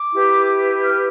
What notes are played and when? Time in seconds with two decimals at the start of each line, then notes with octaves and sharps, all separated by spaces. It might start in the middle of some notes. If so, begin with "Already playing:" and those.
Already playing: D6
0.12 E4 G4 B4
0.84 F6